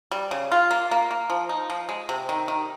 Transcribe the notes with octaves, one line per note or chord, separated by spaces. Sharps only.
G3
C#3
F4
A#3
A#3
A#3
F3
D#4
F3
G#3
C3
D#3
D#3